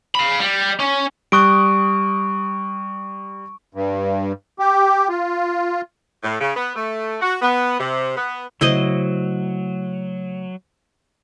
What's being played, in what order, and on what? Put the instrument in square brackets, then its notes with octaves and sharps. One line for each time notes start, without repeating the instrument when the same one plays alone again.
[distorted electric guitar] F5 B5
G3
C#4
[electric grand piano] G3 D#6 F#6 [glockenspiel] C#6 D7
[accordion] G2
G4
F4
[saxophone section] A2
C#3
B3
A3
F#4
B3
C3
B3
[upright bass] C#3 A3 [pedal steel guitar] F#3 [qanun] E4 C5 D#5